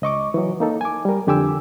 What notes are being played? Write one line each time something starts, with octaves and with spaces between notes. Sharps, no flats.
C#2 D#5 C#6 D6
E3 F#3
A#3 D#4 A4
G#5 D6
G3 A#4
F2 D3 G4 G#5 D6 E6